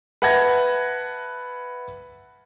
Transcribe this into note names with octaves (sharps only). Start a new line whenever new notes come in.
B4 E5 F#5 A5 G#6 A#6